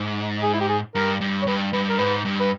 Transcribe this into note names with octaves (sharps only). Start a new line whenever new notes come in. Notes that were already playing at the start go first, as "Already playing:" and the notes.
Already playing: G#2
G#4
E4
G4
G#4
G2 A#4
G2
C#5
G2 B4
G2 B4
A#4
G#2 B4
G2
B4